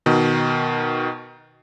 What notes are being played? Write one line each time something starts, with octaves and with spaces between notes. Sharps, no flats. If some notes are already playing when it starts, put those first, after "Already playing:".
B2 D#3